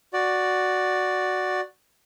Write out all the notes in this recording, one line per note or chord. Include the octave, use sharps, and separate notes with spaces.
F#4 D5